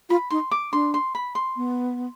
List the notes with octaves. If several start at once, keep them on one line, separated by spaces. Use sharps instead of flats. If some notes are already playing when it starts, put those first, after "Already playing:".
F4 B5
D#4 C6
D6
D4 C6
C6
B5
C6
B3